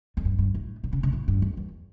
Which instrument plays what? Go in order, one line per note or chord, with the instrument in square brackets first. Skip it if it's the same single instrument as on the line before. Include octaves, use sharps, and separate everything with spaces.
[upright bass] F2
G2
G2
A2
A#2
C#3
C#3
A2
G2
F2
E2